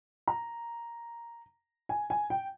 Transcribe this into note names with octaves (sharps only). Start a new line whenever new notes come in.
A#5
G#5
G#5
G5